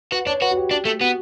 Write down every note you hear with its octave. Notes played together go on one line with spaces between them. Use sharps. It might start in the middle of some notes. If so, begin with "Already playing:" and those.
F#4 B4
D4 C#5
F#4 B4
F#4
G4
D4
A3
B3 F#4